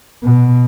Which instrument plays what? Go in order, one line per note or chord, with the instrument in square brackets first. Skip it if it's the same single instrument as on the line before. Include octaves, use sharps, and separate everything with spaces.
[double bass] B2